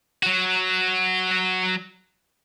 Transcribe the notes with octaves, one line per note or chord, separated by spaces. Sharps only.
F#3 F#4